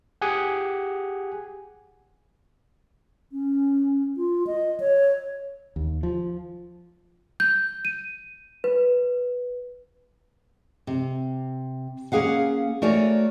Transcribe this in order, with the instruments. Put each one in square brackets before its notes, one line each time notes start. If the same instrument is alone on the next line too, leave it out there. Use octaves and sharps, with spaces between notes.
[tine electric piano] G4 G#4 F#5 G#5
[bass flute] C#4
F4
D#5
C#5
[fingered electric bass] D#2
F3
[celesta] G6
D#7
B4
[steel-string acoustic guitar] C3
A#3 C#4 G#4 F5 F#5
A3 F#4 A#4 C#5 D5 G#5